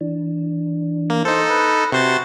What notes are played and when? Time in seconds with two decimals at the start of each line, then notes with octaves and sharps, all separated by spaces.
0.01 E3 D4
1.10 A#3
1.25 D#4 A4 C5
1.50 B4
1.66 A#6
1.92 C3 F#4 C5 A6